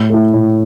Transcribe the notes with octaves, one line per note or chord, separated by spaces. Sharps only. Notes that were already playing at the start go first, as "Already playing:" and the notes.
Already playing: A2
A3 E4
A2